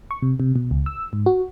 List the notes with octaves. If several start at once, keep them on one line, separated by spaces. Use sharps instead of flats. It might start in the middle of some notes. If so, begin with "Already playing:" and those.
C#6
C3
C3
B2
C#2
E6
G#2
F#4